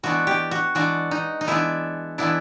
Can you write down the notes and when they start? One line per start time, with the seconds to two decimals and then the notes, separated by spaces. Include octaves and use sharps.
0.03 E3 G#3 B3 D4 F#4
0.27 G4
0.51 F#4
0.75 E3 G#3 B3 D4 F#4
1.11 D#4
1.41 D#4
1.47 E3 G#3 B3 D4 E4
2.18 E3 G#3 B3 D4 E4